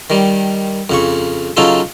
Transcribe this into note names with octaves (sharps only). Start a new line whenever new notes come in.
D#3 G3
F2 C#3 C#6
C#3 F#3 C#4 D#4 F4 A4